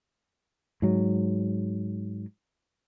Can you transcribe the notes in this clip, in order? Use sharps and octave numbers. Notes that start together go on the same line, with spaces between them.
G#2 F#3